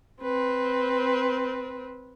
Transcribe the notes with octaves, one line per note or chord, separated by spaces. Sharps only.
C4 B4